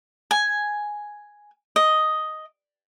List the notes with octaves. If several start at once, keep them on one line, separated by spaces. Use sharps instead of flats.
G#5
D#5